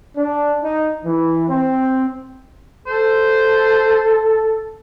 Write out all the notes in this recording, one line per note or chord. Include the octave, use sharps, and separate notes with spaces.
D4
D#4
E3
C4
A4 C5